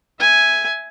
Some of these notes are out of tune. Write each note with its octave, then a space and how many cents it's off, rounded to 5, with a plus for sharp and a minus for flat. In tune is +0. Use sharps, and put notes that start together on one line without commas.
E5 +0 G#5 +0